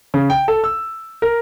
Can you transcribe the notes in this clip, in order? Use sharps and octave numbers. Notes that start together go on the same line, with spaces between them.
C#3
G5
A4
E6
A#4